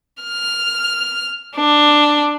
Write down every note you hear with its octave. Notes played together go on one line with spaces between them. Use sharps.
F6
D4